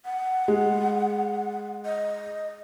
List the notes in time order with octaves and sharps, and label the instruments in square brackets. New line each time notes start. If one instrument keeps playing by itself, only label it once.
[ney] F#5
[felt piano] G#3
[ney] D#5